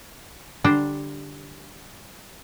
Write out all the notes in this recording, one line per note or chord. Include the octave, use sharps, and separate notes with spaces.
D3 G3 D4 C5 G5 A#5